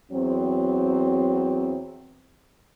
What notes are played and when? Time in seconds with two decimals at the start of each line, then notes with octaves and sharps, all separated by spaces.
0.12 E2 F#3 C4